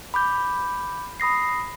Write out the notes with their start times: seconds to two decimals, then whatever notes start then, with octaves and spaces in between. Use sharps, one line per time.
0.14 B5 D6 G6
1.20 B5 D#6 A#6 C7